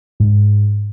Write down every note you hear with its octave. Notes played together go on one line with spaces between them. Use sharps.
G#2